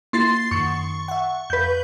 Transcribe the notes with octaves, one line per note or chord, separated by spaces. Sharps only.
A#3 E4 F4 C6 A6 C7
F#2 D#3 C#6
E5 F#5
F2 B4 G6